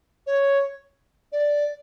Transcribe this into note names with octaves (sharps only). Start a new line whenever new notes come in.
C#5
D5